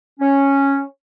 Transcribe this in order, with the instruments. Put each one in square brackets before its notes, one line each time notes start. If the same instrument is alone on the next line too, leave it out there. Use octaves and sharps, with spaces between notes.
[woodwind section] C#4